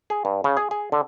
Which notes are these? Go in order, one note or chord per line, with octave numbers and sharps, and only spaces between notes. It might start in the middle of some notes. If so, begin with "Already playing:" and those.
G#4
G2
C#3
G#4
G#4
D3